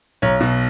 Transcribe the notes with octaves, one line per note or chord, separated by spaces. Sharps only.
B1 C#5
B2